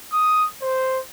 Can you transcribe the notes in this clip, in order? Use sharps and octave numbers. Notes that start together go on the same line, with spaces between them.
D#6
C5